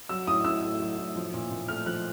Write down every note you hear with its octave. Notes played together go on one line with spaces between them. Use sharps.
F#3 E6
A2 D#6
A2 E6
A3
F#3
A2
F3
A#2
A#2
A3 F6
F3 F#6